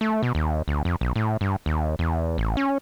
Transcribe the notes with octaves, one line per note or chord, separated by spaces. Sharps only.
A3
B2
D#2
D2
F2
B1
A2
G2
D#2
E2
A1
C#4